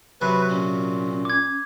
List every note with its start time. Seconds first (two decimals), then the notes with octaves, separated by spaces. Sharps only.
0.21 C3 F#3 B4 G#5
0.50 A#2 C#4
1.25 D6 G#6